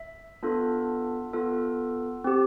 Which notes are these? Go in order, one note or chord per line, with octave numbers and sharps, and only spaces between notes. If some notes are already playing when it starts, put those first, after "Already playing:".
Already playing: E5
B3 D4 F4 A4
B3 F4 A4
C4 G4